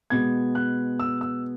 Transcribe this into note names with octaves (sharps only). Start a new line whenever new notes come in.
B2 G#3 B3 G#6
F#6
E6
E6